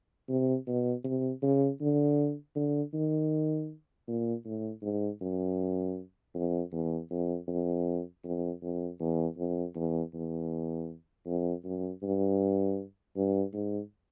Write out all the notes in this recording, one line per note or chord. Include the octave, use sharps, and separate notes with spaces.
C3
B2
C3
C#3
D3
D3
D#3
A#2
A2
G#2
F#2
F2
E2
F2
F2
F2
F2
E2
F2
E2
E2
F2
F#2
G2
G2
G#2